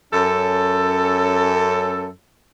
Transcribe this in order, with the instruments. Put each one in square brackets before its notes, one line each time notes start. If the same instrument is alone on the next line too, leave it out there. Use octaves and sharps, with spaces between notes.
[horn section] F#2 C#4 A4